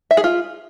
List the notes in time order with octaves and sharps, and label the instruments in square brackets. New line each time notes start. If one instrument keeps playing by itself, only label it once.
[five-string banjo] E5
G#4
F4